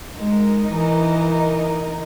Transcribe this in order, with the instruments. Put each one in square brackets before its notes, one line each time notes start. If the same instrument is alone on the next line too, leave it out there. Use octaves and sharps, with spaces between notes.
[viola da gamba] G#3 [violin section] D#4 A#4 D#5
[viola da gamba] E3